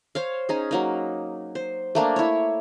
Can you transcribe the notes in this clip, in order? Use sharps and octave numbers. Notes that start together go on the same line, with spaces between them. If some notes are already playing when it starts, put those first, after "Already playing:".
C5 C#5 F5
C#4 D#4 G#4
F#3 A#3 D#4
C5
A3 A#3 D4
E4 C#5